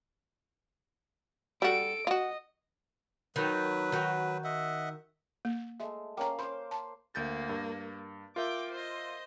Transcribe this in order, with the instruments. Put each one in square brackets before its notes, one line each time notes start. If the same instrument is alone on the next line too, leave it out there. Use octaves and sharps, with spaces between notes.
[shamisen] G3 F#4 [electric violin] A4 D7
[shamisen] F4 F#4 [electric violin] D#5
[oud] D#3 [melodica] F#3 B4
[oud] D#3 F#4
[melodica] D#5 E5 F#5
[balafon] A#3
[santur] G#3 A3 [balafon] E5
[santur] A#3 C#4 F5 [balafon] G5 A#5
[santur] C5 D6 [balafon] B5
[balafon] A5
[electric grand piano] D2 G6 A6 [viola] A#3
[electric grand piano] G2
[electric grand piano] F4 A#4 E5 [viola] G5 D6
[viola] C5 D#5